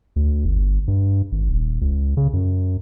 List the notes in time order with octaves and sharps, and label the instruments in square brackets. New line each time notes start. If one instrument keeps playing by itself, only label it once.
[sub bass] D2
G1
G1
G2
G#1
D#1
C#2
C#3
F#2